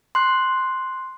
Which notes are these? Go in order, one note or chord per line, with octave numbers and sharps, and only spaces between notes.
C6 F#6